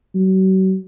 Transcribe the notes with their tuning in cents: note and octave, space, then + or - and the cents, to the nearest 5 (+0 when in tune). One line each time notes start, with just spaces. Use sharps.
F#3 +40